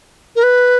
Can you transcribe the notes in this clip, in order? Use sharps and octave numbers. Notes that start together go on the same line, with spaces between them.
A#4
B4